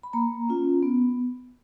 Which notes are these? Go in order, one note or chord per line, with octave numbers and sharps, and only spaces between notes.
B5
A#3 A#5
C#4 F4
B3